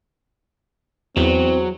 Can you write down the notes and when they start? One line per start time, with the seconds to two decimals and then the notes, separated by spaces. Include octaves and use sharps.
1.17 E2 F#3 C4